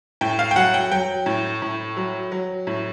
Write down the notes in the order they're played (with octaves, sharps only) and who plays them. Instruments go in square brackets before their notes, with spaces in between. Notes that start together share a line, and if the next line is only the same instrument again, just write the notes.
[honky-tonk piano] A2 G5
F5
G5
F#3 F#5
G5
F#3 G5
A2
A2
F#3
F#3
A2